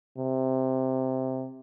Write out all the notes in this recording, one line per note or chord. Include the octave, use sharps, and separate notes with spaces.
C3